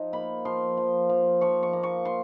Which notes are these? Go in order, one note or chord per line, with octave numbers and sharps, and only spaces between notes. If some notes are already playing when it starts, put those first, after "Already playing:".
Already playing: F3 D#4
A#3 B5
F3 C6
F3
F3
F3 C#6
C#6
A#3
C#6
C6